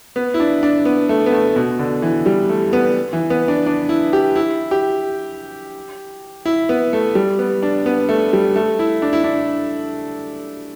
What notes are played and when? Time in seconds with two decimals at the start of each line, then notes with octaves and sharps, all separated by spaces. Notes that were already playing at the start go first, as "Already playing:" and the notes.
0.16 B3
0.34 E4
0.40 D4
0.63 D4
0.85 B3
1.09 A3
1.26 B3
1.32 A3
1.56 B2
1.79 D3
2.02 E3
2.26 G3
2.49 A3
2.73 B3
3.13 E3
3.30 B3
3.48 D4
3.66 D4
3.89 E4
4.13 G4
4.36 E4
4.71 G4
6.46 E4
6.69 B3
6.93 A3
7.15 G3
7.39 B3
7.63 D4
7.86 B3
8.09 A3
8.33 G3
8.56 A3
8.79 E4
9.02 D4
9.13 E4
9.24 D4